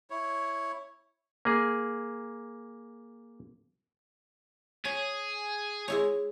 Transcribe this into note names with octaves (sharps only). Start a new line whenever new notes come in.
E4 C#5
A#3 G#4
G#4 C#5
G#3 E4 C#5